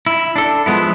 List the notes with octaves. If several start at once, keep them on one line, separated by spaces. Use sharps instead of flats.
E4
D4 A4
F3 G#3 B3 E4